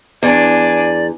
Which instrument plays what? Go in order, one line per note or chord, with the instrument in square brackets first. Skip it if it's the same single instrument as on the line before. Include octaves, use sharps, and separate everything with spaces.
[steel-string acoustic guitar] E2 [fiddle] D4 G#5 [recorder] D5